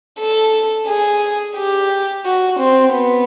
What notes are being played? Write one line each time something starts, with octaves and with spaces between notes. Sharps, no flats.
A4
G#4
G4
F#4
C4
B3